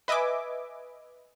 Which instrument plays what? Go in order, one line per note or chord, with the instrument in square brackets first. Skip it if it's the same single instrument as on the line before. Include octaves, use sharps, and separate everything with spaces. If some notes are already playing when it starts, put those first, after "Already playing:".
[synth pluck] B4 D#5 E5 G#5 D6